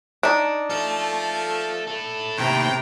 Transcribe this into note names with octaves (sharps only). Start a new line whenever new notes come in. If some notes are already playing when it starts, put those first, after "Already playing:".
D4 D#4
F3 A4 E5
E4 A4
D#2 A2 C3 G5 A#5